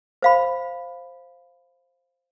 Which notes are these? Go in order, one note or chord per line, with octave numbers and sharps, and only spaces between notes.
C5 F5 B5